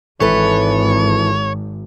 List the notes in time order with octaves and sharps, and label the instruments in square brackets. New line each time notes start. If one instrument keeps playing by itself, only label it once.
[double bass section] G#1 [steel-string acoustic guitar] E3 A4 B4 [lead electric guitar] C#5